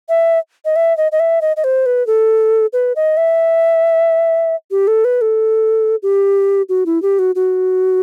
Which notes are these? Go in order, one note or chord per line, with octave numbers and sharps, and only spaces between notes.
E5
D#5
E5
D#5
D#5
E5
D#5
D#5
C5
B4
A4
B4
D#5
E5
G4
A4
B4
A4
G4
F#4
E4
G4
F#4
F#4